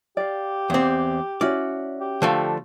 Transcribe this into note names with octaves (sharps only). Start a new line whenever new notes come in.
G4 D5 F5
E2 C4
C#4 E4 F#4 D5
G4
D3 F3 A3